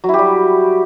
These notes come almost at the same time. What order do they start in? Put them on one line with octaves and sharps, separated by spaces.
F#3 E4 G4 G3